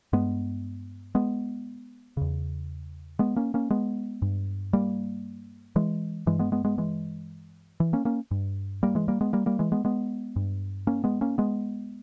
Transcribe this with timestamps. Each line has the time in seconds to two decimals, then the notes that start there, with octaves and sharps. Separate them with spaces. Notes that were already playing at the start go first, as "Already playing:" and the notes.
0.13 G2 G#3 B3
1.15 G#3 B3
2.17 E2 C#3
3.19 G#3 B3
3.36 A#3 C#4
3.54 A#3 C#4
3.70 G#3 B3
4.22 G2
4.73 G3 A#3
5.76 E3 G#3
6.27 G2 E3 G#3
6.39 G#3 B3
6.52 G#3 B3
6.65 G#3 B3
6.78 E3 G#3
7.80 E3
7.93 A#3 C#4
8.05 A#3 C#4
8.31 G2
8.83 G3 A#3
8.95 E3 G#3
9.08 G3 A#3
9.21 G#3 B3
9.33 G3 A#3
9.46 G3 A#3
9.59 E3 G#3
9.72 G#3 B3
9.85 G#3 B3
10.36 G2
10.87 A#3 C#4
11.04 G#3 B3
11.21 A#3 C#4
11.38 G#3 B3